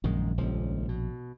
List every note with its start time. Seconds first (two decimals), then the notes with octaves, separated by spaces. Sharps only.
0.04 A#1 F#2 D#3 G#3
0.37 D#1 C#2 F3
0.89 B2